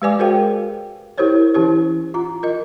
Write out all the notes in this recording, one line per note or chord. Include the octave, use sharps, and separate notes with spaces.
G#3 G4 B4 D5 G#5 D6
F#4 G#4 A#4 C5 F5 G5
E4 G4 A#4 C5 C#5
E3 C#4 E4 G4 C5
F4 A#5
F4 A#4 D#5